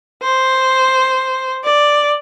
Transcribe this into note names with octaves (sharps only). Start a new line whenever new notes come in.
C5
D5